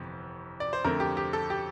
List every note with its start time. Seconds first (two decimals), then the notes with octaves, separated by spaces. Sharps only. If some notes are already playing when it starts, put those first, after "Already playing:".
Already playing: G1 F2 C3 E3
0.60 D5
0.73 C5
0.84 F2 D3 A3 C4 A#4
1.00 G4
1.17 G4
1.33 A4
1.50 G4